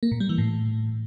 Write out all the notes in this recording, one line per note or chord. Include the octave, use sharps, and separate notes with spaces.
A#3
A#2
G3
E3
A2